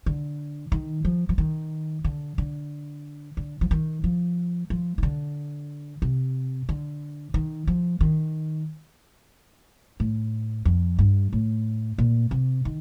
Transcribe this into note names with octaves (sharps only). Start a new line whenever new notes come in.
D3
D#3
F3
F3
D#3
D3
D3
D3
F3
D#3
F3
F3
D#3
D3
C3
D3
D#3
F3
D#3
A2
F2
G2
A2
A#2
C3
D#3